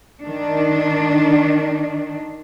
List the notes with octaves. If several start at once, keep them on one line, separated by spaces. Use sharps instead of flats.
D#3 D4